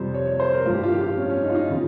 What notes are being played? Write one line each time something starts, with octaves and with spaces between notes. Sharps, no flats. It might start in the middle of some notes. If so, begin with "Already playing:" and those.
Already playing: F2 C3 G3 C5
C#5
C#5
C5
A#4
G2 F3 F4
G4
F4
G4
F4
C#4
C#4
D#4
F4
D#4
C#3 F3 F4